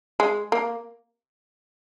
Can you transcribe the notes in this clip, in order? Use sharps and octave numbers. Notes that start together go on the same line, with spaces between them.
G#3
A#3